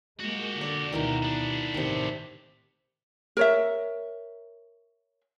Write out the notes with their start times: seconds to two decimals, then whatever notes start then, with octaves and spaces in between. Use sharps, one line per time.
0.20 G#3 A#3 F#4 G4
0.61 D3 D5
0.92 D2 B2 D#3 E3 A#4
1.23 B3 D4
1.74 A1 A2 C3 D#3
3.37 A#4 C#5 E5